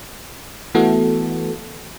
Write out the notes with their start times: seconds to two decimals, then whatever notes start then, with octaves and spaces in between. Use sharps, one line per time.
0.74 E3 A3 B3 F#4 A4